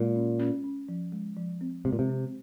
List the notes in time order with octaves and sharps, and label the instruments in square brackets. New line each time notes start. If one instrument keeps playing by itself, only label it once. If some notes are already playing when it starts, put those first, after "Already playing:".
Already playing: [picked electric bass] A#2 [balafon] G#3
[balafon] C#4
C#4
C#4
F3
G#3
F3
C4
[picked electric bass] C3 [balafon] G#3
[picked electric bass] A#2
C3
[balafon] C4